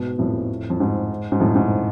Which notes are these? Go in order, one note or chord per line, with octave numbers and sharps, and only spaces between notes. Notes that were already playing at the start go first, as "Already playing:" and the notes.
Already playing: G#2 B2
F2 A2
F2
G#2
G#2
F2 A2
G#2